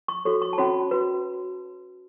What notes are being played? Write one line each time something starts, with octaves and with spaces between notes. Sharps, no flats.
C#6
F#4 A4 C#5 C#6
C#6
A5
C#4 F#4 C#5 B5
F#4 B4